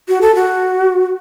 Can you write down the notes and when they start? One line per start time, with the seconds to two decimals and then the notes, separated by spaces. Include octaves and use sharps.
0.08 F#4
0.21 A4
0.35 F#4